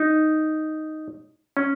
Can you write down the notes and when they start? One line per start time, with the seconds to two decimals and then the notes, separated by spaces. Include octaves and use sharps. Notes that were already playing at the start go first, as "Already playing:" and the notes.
Already playing: D#4
1.57 C#4